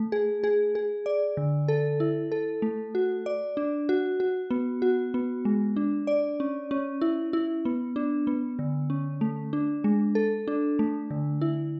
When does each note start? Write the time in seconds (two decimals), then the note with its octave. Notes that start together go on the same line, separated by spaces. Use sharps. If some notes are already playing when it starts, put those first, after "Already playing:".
Already playing: A3
0.12 G#4
0.44 G#4
0.75 G#4
1.06 D5
1.37 D3
1.68 A4
2.00 E4
2.32 A4
2.62 A3
2.95 F#4
3.26 D5
3.57 D4
3.89 F#4
4.20 F#4
4.51 B3
4.82 F#4
5.14 B3
5.45 G#3
5.76 D4
6.07 D5
6.40 C#4
6.71 C#4
7.01 E4
7.33 E4
7.65 B3
7.96 D4
8.27 B3
8.59 D3
8.90 C#4
9.21 A3
9.53 D4
9.84 G#3
10.15 A4
10.47 D4
10.79 A3
11.11 D3
11.42 E4